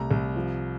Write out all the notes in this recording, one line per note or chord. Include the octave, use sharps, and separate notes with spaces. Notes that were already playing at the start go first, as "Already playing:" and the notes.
Already playing: C2 A3 A#5
C2
F3